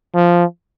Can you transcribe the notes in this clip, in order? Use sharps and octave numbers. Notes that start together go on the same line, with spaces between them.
F3